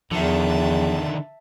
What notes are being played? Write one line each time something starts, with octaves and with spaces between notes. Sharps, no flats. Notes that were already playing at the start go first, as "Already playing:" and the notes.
E2 D3 D#3 F3 E5 A5